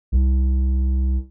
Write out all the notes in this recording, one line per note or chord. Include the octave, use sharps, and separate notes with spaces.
C2